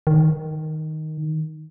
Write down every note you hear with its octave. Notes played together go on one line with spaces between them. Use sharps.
D#3